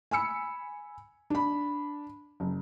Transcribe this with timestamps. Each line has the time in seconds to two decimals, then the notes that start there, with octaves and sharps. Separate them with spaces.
0.11 G#5 B5 E6 C#7
1.30 D4 B5
2.40 F#1